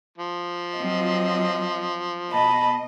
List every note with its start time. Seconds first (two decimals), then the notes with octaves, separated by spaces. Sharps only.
0.18 F3
0.78 F#3 C4 F4 D#5
2.32 B2 D#5 A5 B5